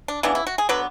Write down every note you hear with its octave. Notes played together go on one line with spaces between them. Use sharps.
D4
C#3 E3 B3 D4
E4
F#4
G#4
D3 F#3 B3 B4